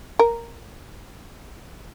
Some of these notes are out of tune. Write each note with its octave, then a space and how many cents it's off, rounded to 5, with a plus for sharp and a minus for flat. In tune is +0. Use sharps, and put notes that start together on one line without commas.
A#4 -5